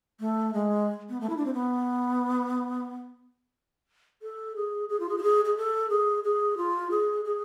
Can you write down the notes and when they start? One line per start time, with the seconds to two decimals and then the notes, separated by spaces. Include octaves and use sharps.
0.20 A3
0.54 G#3
1.09 B3
1.21 A3
1.30 E4
1.37 D4
1.46 C4
1.54 B3
4.22 A4
4.56 G#4
4.89 G#4
5.00 F4
5.09 G#4
5.18 F4
5.23 G#4
5.45 G#4
5.57 A4
5.90 G#4
6.24 G#4
6.57 F4
6.91 G#4
7.25 G#4